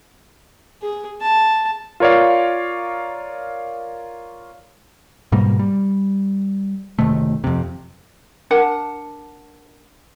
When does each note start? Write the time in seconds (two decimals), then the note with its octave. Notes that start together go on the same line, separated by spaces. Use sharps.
0.82 G#4
1.22 A5
2.00 F4 A#4 C#5 D5 F5
5.32 G#2 B2 G3 A#3
5.59 G3
6.99 F#1 C3 D#3 A3
7.44 F2 C3
8.51 D4 A#4 F#5 A5